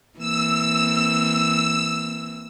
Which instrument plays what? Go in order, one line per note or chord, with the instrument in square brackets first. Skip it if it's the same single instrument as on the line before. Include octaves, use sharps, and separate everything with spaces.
[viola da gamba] E3 A#3 C4 [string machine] E6